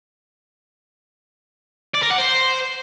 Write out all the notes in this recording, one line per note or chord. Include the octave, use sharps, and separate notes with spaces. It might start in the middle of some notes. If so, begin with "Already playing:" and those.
D5
A#4
F#5
C5